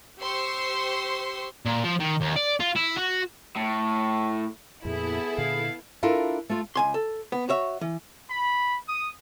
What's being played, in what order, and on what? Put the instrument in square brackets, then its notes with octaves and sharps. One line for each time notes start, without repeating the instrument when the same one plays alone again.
[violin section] G4 C5 C6 C#6 E6
[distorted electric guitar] A#2
F3
D#3
D#2
D5
F4
E4
F#4
[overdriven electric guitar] A2
[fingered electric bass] F2 A#2 [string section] B3 E4 A4 [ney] G#4
[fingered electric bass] A#2 D3 [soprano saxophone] F5
[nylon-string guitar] D4 E4 F4 A4 A#4
A3 F4
[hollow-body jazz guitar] C#2 G#5 C6
A4
B3
F#4 C#5 E5
E3
[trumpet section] B5
D#6